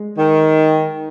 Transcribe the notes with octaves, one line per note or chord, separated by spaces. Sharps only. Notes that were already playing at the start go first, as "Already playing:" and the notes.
Already playing: G#3
D#3